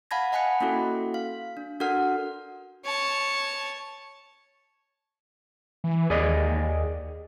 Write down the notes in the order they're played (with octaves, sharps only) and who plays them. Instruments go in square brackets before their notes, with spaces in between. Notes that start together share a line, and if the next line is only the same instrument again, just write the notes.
[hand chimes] F5 F#5 A5 B5 G#6 A#6
D#5 F#5 G#5 B5 F#6 C#7
A#3 C#4 E4 F#4 A4
F5
D4
D4 F#4 A4 A#4 F#5 F6
[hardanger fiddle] C#5 A5
[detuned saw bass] E3
[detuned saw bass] D#2 [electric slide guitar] G#4 D5 D#5